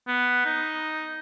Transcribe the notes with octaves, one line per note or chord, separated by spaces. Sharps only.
B3
D#4